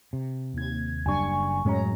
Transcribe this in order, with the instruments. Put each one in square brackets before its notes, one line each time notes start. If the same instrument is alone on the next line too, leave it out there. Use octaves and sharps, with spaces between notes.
[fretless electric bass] C3
[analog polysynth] D#2 G#6
[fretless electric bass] F#1 G3 D4 [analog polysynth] G#5 C#6
[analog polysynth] F#2 F#3 A#5 [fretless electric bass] A2 G#3 C#4